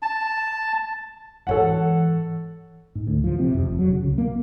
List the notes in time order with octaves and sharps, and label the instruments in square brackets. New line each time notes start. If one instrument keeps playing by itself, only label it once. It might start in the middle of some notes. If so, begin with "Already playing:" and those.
[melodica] A5
[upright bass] G#2 E3 [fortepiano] A4 C#5 F#5
[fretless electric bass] G#2
D2
F3
C3
F2
F1
F#3
C#3
C2
A#3